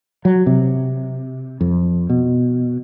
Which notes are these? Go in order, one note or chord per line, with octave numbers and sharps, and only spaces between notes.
F#3
C3
F2
B2